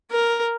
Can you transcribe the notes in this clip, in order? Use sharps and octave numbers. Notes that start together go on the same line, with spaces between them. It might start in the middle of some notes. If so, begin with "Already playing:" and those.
A#4